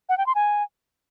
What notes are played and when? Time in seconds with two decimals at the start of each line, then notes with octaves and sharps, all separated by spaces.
0.09 F#5
0.18 G5
0.26 C6
0.35 G#5